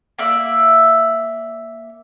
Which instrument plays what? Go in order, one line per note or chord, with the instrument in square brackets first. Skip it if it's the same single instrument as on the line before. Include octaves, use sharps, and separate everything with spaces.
[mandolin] A#3 D5 E5